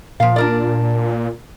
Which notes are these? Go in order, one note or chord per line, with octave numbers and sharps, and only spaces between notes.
A#2 F3 F5
D4 A#4 D5